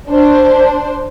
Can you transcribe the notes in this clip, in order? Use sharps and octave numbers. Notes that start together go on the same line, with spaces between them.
D4 C5